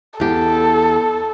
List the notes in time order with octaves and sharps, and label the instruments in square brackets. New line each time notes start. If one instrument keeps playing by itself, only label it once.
[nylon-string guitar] E2 G4 [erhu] A4